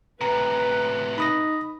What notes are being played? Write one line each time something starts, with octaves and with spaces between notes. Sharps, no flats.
A2 C3 B4 A#5
D#4 B5 D#6 A#6